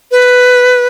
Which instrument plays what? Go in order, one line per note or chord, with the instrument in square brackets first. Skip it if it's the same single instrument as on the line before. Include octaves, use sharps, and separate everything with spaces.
[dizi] B4